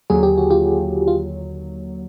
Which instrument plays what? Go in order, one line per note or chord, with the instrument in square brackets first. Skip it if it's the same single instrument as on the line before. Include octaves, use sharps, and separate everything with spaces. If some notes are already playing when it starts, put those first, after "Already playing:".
[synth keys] D#2 D3 F#3 [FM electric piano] G#4
[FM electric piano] G4
F#4
F4 G4
F4